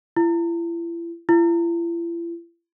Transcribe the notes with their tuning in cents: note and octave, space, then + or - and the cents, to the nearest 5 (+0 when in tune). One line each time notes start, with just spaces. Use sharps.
E4 +40
E4 +45